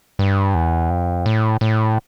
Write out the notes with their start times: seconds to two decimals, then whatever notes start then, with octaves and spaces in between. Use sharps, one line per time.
0.19 G2
0.55 E2
0.90 F2
1.26 A2
1.61 A2